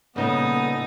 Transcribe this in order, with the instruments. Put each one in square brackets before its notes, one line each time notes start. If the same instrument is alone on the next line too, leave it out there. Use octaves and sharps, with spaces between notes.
[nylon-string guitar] A#2 C#3 G3 [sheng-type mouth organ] B3 [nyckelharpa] D#4 [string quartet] A4 D#6